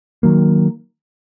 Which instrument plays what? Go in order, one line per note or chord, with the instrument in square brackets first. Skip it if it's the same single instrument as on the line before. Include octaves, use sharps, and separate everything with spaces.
[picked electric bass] D#3 F#3 A#3